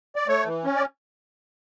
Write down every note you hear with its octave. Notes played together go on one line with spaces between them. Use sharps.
D5
A3 C#5
E3
C#4
D5